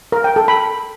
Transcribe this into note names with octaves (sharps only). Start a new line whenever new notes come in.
A#4
G5
A4
B5